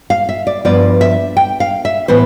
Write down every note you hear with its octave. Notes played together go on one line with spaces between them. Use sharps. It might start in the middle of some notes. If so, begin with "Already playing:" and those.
F5
E5
D5
G2 F3 B3 D5
E5
G5
F5
E5
A2 E3 B3 C5